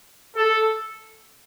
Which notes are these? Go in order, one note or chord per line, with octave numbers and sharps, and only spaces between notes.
A4